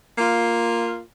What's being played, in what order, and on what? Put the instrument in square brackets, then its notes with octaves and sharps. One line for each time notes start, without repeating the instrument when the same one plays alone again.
[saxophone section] A#3 F4